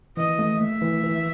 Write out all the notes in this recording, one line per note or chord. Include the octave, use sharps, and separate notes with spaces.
E3 D#5
A3
A3 E5
E3
E3